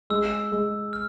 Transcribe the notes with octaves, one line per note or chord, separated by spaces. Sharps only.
G#3 E6
G#3
F6